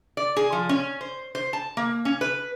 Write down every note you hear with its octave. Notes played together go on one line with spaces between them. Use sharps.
D5
G#4
F3
C#4
C5
C5
A5
A#3
C#4
B4